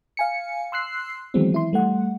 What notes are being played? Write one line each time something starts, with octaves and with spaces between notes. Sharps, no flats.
F5 G#5 C#7
C6 E6 F#6 C7
D#3 E3 F#3 G#3 B3 C4
E3 E4 C6
G3 A3 F#5